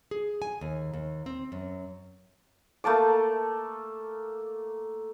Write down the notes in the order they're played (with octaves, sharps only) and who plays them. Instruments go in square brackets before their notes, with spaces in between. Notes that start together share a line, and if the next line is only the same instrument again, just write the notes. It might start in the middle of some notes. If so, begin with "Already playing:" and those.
[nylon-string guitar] G#4
G#5
D#2
D#2
C4
F#2
[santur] A3 A#3 A5 D6